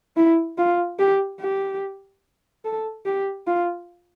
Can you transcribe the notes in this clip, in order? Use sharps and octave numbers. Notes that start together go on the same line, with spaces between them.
E4
F4
G4
G4
A4
G4
F4